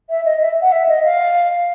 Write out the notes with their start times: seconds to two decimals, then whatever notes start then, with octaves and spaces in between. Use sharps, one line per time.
0.10 E5
0.25 D#5
0.41 E5
0.62 F#5
0.72 E5
0.89 D#5
1.04 F5